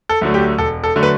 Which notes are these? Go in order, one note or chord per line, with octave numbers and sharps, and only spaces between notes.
A4
D2 D3 F#3 A3
G4
E1 A4
A4
D3 F#3 A3
B4